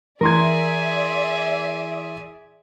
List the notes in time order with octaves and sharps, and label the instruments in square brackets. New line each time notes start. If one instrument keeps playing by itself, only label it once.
[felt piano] E3 C6 G#6 [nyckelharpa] G#4 G#5 [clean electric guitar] A#4 [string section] D5 E5